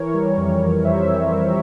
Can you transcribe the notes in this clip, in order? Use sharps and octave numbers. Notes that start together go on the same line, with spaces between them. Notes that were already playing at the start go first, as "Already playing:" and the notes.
Already playing: E3 A#4 C#5
G3
F2
F2
E3 C5 E5
G3
F2 A#4 C#5